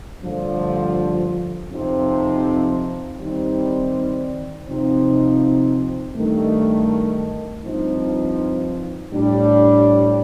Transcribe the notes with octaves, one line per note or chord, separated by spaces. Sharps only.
G2 D3 F3 A3
F2 C3 F3 C4 D#4
D#3 G3 C4 D#4
C3 F3 C4 D#4
G2 D#3 A3
G2 F3 C4 D#4
A2 G3 D4